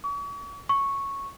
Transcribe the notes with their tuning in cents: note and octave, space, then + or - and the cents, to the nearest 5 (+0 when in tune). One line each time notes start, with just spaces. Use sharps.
C#6 +40
C#6 -5